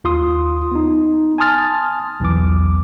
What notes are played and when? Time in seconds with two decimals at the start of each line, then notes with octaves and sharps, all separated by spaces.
0.04 D#2 F4 C6 D#6
0.71 B3 D#4
1.38 G#5 A5 C6 D#6 F6 A6
2.20 B1 E2 E3 D6